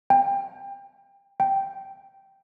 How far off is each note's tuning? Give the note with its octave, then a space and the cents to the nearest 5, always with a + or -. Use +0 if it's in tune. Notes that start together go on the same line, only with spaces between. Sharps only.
G5 +25
G5 -5